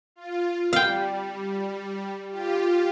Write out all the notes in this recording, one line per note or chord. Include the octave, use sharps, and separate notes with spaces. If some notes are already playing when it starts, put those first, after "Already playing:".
F4
G3 F5 G5
F4 G4